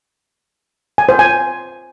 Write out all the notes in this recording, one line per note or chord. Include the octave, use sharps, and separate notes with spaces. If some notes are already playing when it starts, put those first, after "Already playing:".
G#5
C5
G#5